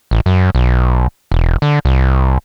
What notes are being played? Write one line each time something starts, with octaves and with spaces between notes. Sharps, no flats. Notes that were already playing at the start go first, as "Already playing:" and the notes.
A1
F#2
B1
E1
D3
C2